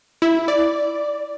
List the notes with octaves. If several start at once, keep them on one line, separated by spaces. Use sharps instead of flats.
E4
D5